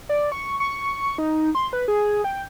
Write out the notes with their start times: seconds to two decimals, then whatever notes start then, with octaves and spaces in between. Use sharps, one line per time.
0.09 D5
0.32 C#6
0.60 C#6
1.18 D#4
1.55 C6
1.73 B4
1.88 G#4
2.24 G5